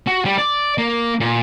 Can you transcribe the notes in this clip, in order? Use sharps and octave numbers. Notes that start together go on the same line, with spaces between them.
F#4
G3
D5
A#3
A#2